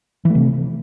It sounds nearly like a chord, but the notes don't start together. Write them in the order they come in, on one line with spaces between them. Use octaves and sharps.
E3 A3 C3